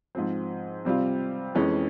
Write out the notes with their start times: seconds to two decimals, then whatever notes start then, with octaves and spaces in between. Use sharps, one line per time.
0.15 G#2 F3 C4
0.85 C3 G3 C4 F4
1.55 F2 E3 G#3 C#4